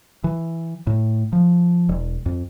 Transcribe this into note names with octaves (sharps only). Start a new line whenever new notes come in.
E3
A2
F3
E1
F2